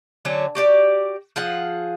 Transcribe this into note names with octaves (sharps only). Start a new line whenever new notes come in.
D3 F#3 C#4
F#4 G4 D5
F3 F4 G#4 F#5